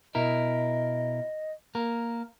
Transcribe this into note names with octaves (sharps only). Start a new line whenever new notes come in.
B2 E4 A#4 D#5
A#3 A#4